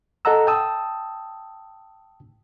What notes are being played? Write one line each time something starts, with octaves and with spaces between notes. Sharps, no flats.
A4 D#5 F#5 A#5 E6
G5 A5 D#6 E6